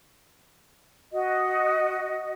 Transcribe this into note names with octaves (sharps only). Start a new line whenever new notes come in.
F#4 D#5